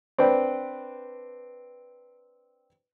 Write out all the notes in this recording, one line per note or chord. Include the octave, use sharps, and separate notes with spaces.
C4 D4 B4 G5